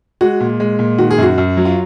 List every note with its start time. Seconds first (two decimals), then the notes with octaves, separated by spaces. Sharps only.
0.21 G#3 F#4
0.40 A#2
0.60 G#3
0.79 A#2
0.98 D#3 F#4
1.11 G#4
1.18 F#2 F#4
1.38 F#2
1.57 F#3
1.65 F4